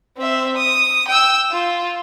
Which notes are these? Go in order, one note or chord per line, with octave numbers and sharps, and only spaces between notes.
C4 E5
D#6
G5 E6
F4